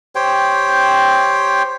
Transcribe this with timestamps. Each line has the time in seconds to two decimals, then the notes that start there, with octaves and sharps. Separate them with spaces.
0.15 G4 C5 C#5 G5